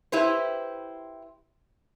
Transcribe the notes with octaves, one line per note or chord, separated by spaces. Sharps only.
E4 G4 B4 C5